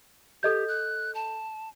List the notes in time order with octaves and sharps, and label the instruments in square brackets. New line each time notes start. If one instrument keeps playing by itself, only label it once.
[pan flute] G4 [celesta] A4 D#5 G6
[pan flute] F#6
A5